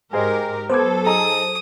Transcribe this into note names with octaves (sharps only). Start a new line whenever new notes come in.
G#2 G4 G#4 A#4 C5 D#5
F#3 B3 A4 C5 D6 G#6
D#4 G#4 A#5 D#6